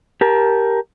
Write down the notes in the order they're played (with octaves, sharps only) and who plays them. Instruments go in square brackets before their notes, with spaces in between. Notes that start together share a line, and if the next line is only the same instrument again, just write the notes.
[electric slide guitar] G4 A#4 A5